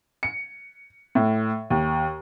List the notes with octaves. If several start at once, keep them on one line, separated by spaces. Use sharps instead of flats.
C#7
A2
D#2